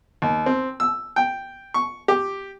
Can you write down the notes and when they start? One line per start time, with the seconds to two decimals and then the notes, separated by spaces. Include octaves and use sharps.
0.22 D#2
0.46 C4
0.80 E6
1.16 G5
1.74 C#6
2.08 G4